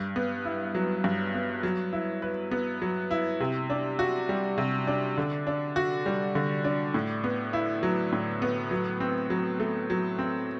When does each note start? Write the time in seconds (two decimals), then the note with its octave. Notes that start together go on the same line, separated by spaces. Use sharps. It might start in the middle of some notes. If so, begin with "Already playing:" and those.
Already playing: G2
0.16 B3
0.45 E4
0.75 F#3
1.04 G2
1.34 B3
1.63 F#3
1.93 E4
2.22 B4
2.51 B3
2.82 F#3
3.11 E4
3.40 C3
3.70 D4
3.99 F#4
4.29 G3
4.58 C3
4.87 D4
5.17 D3
5.47 D4
5.76 F#4
6.06 G3
6.35 D3
6.64 D4
6.94 A2
7.24 B3
7.53 E4
7.83 F#3
8.12 A2
8.42 B3
8.71 F#3
9.00 C4
9.30 F#3
9.60 A3
9.90 F#3
10.19 C4